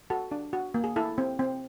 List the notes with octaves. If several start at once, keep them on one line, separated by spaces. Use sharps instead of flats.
F#4 A4
D4
F#4
A#3
G#4
E4 A4
C4
C4